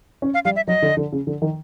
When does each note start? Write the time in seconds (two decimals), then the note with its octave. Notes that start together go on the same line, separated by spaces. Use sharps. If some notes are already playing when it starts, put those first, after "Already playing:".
0.22 C#4
0.34 F5
0.45 G3 F5
0.56 E5
0.67 F#3 D#5
0.82 D3
0.97 D3
1.12 C#3
1.27 D3
1.42 D#3